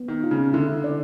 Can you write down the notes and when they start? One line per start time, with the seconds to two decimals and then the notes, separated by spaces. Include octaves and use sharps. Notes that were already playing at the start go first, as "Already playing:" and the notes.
Already playing: B3
0.08 D#3
0.23 F4
0.31 C#3
0.53 D3 E4
0.84 D5